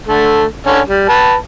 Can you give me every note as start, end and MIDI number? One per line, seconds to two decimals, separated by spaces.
0.07 0.45 50
0.07 0.45 57
0.66 0.80 50
0.66 0.80 61
0.88 1.08 55
1.09 1.35 71
1.09 1.35 81